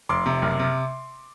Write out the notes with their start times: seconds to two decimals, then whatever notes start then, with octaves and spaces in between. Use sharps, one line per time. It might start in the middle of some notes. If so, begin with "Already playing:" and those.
0.09 F1 C6 D6
0.26 C3
0.42 F#1
0.59 C3